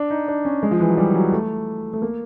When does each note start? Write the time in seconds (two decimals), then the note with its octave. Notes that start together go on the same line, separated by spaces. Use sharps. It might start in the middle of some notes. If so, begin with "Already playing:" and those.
Already playing: D4
0.10 D#4
0.28 D4
0.45 C#4
0.63 G#3
0.71 F3
0.80 E3
0.89 F#3
0.97 G3
1.15 F#3
1.32 A3
1.93 A3
2.02 A#3